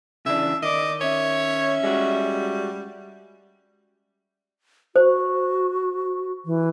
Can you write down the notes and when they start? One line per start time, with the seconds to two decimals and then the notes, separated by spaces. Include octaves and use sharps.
0.26 C#3 E3 D4 E5
0.62 D#3 D5 D#5 D6
1.01 C#4 C#5 E5
1.83 G3 G#3 F#4
4.96 F#4 C5
6.45 E3